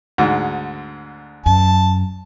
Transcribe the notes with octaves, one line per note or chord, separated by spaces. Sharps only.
D2 G#2
F#2 A5